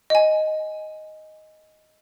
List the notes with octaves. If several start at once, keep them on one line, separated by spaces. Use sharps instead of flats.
D#5 G#5